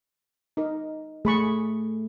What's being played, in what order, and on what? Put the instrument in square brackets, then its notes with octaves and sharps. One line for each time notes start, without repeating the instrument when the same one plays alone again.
[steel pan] D#4 A#4
[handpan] A3 [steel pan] G#4 B5 C#6